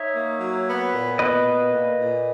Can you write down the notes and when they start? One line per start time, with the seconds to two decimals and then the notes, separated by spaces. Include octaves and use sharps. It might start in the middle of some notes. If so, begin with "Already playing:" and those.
Already playing: D#4 C#5 E5
0.14 A#3
0.40 F#3
0.67 B3
0.93 A#2
1.19 B3 B4 D#5
1.46 A#2
1.72 A#2
1.98 A#2